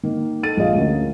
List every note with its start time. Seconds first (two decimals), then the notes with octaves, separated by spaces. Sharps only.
0.03 D#3 A#3
0.43 D#4 A4 A6 D#7
0.57 A#1 G#3 D#5 F5
0.75 D2 C#4 A#4